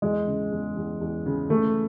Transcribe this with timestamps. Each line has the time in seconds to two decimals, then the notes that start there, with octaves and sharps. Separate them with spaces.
0.02 E2 G#3
0.27 C#3
0.52 E2
0.77 E2
1.01 E2
1.26 C#3
1.50 E3 A3